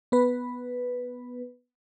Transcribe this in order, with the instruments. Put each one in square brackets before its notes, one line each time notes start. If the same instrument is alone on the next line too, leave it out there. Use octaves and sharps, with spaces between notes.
[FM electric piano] B3 B4